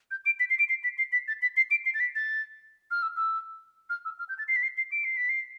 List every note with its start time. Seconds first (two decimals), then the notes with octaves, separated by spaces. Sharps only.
0.11 G6
0.26 D7
0.40 B6
0.50 C7
0.59 D7
0.69 C7
0.84 B6
0.98 C7
1.12 B6
1.28 A6
1.42 B6
1.57 C7
1.71 D7
1.85 C7
1.94 A6
2.00 B6
2.15 A6
2.91 F6
3.02 E6
3.17 E6
3.90 F6
4.05 E6
4.19 F6
4.29 G6
4.38 A6
4.48 C7
4.56 B6
4.63 C7
4.77 C7
4.92 D7
5.04 C7
5.17 B6
5.29 C7